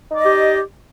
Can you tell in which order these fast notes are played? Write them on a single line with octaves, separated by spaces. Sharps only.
D#4 D5 D#5 G4